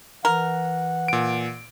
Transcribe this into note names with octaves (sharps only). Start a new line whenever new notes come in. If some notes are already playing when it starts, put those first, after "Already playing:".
E3 A#4 F#5
A#2 D7